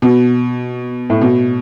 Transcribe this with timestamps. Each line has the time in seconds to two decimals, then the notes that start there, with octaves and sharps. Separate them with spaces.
0.02 B2
1.10 A2
1.21 B2